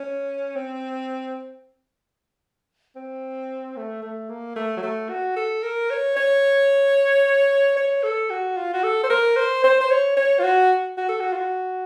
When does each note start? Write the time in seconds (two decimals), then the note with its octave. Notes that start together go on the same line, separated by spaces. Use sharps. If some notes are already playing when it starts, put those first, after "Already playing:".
Already playing: C#4
0.55 C4
2.96 C4
3.76 A3
4.02 A3
4.29 A#3
4.56 A3
4.77 F#3
4.82 A3
5.10 F#4
5.36 A4
5.63 A#4
5.90 C#5
6.16 C#5
7.77 C#5
8.03 A4
8.30 F#4
8.57 F4
8.74 F#4
8.83 A4
9.03 C5
9.09 A#4
9.36 C5
9.64 C5
9.80 C5
9.90 C#5
10.17 C#5
10.39 F4
10.44 F#4
10.97 F#4
11.09 A4
11.20 F#4
11.32 F4
11.36 F#4